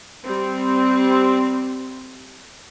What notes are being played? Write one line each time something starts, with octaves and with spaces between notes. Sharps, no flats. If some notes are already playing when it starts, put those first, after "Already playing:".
G3 C4